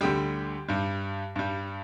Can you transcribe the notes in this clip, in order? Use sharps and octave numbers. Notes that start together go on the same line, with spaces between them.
D2 D3 G3 G4
G2 G3
G2 G3